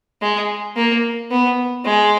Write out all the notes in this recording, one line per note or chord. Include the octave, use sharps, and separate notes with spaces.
G#3
A#3
B3
G#3